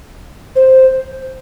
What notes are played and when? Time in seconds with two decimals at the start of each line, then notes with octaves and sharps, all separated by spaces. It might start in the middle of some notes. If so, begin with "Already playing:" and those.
0.56 C5